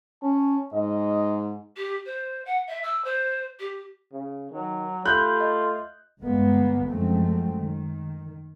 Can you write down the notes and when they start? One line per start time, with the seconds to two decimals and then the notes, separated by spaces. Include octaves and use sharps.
0.23 C#4 A5
0.73 G#2 D#5
1.76 G4
2.05 C5
2.45 F#5
2.67 E5
2.83 E6
3.04 C5
3.59 G4
4.12 C#3
4.51 D#3 F#3
5.06 A3 F4 G4 B5 F#6 G6
5.40 D#5
6.20 D2 G2 G#3 A#3 B3
6.87 F#2 F3 G#3 A3 C4
7.58 D#3